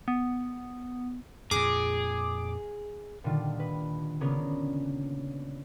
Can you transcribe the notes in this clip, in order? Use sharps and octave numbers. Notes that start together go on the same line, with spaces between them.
B3
F2 A#2 G#4 D6
A#2 D3 D#3 G3 F4
B4
C#3 A#3 B3 C#4 D4 A#4